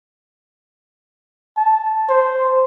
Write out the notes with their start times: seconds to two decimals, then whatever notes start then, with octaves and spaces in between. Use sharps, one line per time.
1.57 A5
2.09 C5